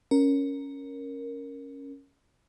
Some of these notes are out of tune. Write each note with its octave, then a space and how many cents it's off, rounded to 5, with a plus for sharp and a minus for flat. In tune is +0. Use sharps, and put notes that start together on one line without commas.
C#4 +0 A#4 +0